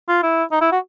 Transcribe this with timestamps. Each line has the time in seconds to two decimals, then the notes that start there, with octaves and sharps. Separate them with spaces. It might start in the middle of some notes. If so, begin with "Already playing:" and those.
0.08 F4
0.23 E4
0.52 D#4
0.61 E4
0.72 F#4